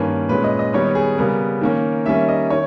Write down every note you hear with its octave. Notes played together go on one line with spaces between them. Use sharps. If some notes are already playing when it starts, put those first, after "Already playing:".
Already playing: G2 D#3 A#3 C#4 B4
A#2 G#3 C#4 B4
D#5
D#5
D#3 G3 B3 D#4 C#5
G#4
C#3 G3 B3 A#4
D#3 A#3 C#4
D#3 G3 A#3 C#4 E5
D#5
D#3 C#5